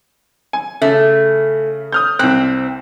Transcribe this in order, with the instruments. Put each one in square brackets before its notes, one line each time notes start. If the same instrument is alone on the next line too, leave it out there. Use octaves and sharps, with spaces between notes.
[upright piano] G#5
[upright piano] C#3 [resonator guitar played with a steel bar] A3
[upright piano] D#6 F6 G6
[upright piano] C2 F#6 [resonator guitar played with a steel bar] C4